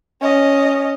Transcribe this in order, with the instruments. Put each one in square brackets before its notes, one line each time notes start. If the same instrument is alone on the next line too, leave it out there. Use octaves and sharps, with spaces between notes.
[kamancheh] C#4 D#5